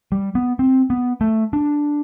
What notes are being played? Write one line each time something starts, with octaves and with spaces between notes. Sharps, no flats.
G3
B3
C4
B3
A3
D4